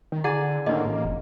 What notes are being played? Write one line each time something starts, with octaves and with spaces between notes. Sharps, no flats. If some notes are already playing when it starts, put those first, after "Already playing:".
D#3
D3 E4 G#4 D5 F#5 G#5
A2 D3 D#3 A#3 D#5
A1
F1